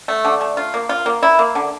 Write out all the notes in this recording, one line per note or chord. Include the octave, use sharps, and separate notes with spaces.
A3
D3
A3
F4
A#3
F4
A#3
E4
A#3
D3